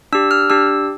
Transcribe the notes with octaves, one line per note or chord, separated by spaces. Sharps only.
D4 G4 E6
F6
D4 G4 E6